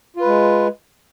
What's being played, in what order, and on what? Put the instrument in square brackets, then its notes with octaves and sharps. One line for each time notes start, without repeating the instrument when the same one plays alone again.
[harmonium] F4
B4
G#3